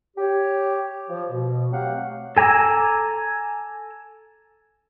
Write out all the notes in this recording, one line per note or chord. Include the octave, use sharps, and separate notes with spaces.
G4 C#5
F3
B2
F#3 A3 C4 G4 F5 F#5
A4 G#5 A#5 D6 E6